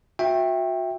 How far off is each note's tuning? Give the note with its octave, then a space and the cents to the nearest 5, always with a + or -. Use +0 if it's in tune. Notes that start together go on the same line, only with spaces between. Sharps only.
F#4 -30 E5 +0 G5 +5